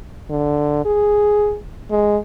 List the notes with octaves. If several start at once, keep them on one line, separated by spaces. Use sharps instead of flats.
D3
G#4
G#3